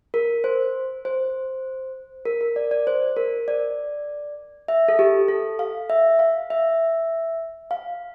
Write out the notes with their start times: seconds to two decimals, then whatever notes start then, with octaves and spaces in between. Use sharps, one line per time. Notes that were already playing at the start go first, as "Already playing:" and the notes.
0.14 A#4
0.44 C5
1.05 C5
2.26 A#4
2.41 A#4
2.56 D5
2.71 D5
2.87 C5
3.16 A#4
3.48 D5
4.68 E5
4.88 A4
4.99 G4
5.28 A4
5.59 F5
5.90 E5
6.19 F5
6.50 E5
7.71 F5